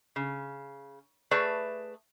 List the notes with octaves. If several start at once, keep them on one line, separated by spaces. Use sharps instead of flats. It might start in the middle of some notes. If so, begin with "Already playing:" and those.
C#3
A3 G#4 B4 D5 A5